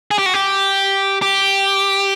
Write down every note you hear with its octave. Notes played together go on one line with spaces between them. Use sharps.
G#4
G4
F#4
G4
G4